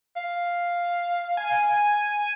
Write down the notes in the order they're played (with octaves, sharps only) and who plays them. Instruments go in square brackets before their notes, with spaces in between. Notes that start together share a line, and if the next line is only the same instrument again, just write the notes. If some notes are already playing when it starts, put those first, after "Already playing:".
[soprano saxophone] F5
[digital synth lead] G#5